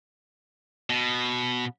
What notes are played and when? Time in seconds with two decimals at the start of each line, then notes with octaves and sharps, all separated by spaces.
0.90 B2